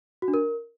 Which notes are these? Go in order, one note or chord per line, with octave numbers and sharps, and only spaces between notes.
F#4
D4
A#4